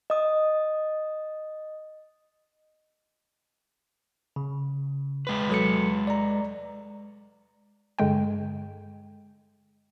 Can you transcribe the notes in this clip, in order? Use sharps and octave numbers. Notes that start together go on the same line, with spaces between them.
D#5 D#6
C#3
G#3 B4
F#3 A4 C#7
D5 A#5
G2 D3 G#3 G5